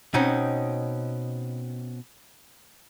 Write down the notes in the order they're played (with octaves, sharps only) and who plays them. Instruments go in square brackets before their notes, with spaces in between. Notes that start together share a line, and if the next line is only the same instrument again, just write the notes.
[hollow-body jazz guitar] B2 C4 C#4 D#4